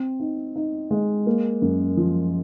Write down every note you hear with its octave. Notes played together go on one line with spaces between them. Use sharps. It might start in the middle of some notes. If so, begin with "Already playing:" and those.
Already playing: C4
D#4
D#4
G#3
A#3
F#2
F3